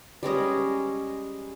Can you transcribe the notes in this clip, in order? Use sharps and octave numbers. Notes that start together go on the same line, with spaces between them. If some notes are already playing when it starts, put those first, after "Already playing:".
G3 G#3 C#4 D#5